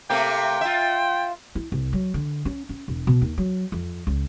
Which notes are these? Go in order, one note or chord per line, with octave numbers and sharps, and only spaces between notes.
C3 A3 A#3 G5
F4 E5
E4
C2
F#3
D3
C#4
C#4
E1
B2
D#2
F#3
F2
C#2